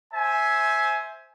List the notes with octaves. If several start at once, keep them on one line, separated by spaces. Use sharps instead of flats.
C5 E5 G#5